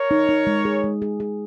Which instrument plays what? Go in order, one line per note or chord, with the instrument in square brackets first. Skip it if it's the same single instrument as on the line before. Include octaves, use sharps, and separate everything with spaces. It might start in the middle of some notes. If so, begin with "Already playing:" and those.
Already playing: [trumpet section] A#4 C#5
[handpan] D#4
D#4
G#3
G#4
G#3
G#4
G#4